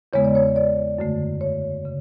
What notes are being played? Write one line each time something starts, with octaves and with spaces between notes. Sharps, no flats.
E2 C#3 G#3 B3 C#5
D5
C#5
D5
F#2 D3 A3
C#5
C#3